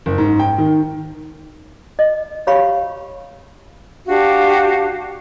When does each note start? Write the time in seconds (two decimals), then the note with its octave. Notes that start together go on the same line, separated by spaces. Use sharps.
0.06 F#1
0.18 G#2
0.39 G5
0.58 D#3
1.99 D#5
2.47 G4 C#5 F5 B5 C#6
4.07 D4 F#4 G4 F5